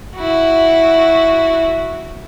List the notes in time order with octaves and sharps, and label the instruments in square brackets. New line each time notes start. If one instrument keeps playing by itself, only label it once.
[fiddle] E4 F#4